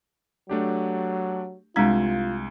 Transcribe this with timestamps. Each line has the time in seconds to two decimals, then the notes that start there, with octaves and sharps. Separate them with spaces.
0.49 F#3 A3 D4 G4
1.76 C2 G#3 D4 F4 A#5 G#6